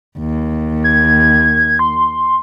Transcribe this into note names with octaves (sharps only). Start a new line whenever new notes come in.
D#2
G#6
C6